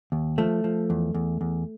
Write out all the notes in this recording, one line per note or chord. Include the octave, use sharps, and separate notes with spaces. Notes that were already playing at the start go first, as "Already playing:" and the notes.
D#2
F3 A3
F3
E2
E2
E2